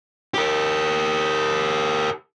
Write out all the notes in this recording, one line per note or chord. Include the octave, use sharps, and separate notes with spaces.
G4 A#4